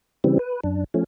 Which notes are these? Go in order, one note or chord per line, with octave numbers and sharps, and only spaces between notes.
C#3 E3 G3 C4
B4
F#2 D4
F3 A3 C#4